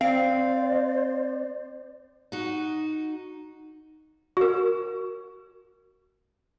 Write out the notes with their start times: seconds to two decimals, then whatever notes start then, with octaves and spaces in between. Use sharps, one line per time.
0.01 C4 C5 D5 F5
2.32 D#4 F#4
4.37 F#4 A#4